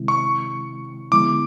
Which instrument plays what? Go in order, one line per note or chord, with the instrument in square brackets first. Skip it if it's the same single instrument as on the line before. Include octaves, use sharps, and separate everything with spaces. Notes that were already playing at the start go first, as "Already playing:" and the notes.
Already playing: [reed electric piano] C3 D#3 G#3 C4 E4
[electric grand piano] C#6
[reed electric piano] D3 F3 G#3 B3 E4 [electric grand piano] D6